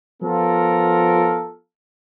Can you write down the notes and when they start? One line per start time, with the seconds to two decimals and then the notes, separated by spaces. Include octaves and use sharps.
0.23 F3 B3 F4 A4 A#4